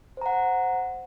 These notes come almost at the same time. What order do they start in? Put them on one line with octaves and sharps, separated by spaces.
C5 A#5 F#5